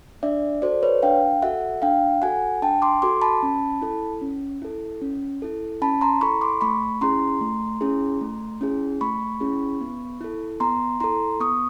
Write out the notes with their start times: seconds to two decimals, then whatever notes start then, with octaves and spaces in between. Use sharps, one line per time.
0.23 D4 D5 E5
0.62 F#4 A4 C5 D5
0.83 B4 C#5
1.02 D4 F5 G5
1.42 F#4 A4 E5 F#5
1.82 D4 F5 G5
2.22 F#4 A4 F#5 G#5
2.62 D4 G5 A5
2.82 C6 D6
3.02 F#4 A4 C6 D6
3.22 A5 B5
3.43 C#4
3.82 E4 A4
4.21 C#4
4.62 E4 A4
5.02 C#4
5.42 E4 A4
5.82 C#4 A5 B5
6.01 A#5 C6
6.21 E4 A4 B5 C#6
6.41 C6 D6
6.61 A3 B5 C#6
7.01 C#4 E4 G#4 A#5 C6
7.41 A3
7.81 C#4 E4 G#4
8.21 A3
8.61 C#4 E4 G#4
9.01 A3 B5 C#6
9.41 C#4 E4 G#4
9.81 B3
10.21 E4 A4
10.60 B3 A#5 C6
11.00 E4 A4 A#5 C6
11.40 B3 C#6 D#6